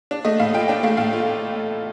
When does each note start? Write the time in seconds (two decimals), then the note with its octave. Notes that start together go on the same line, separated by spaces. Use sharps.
0.11 D4
0.25 A3 D#5
0.40 A2 F5
0.53 F4 G5
0.68 D4 G5
0.83 A3 F5
0.97 A2 F5
1.13 F4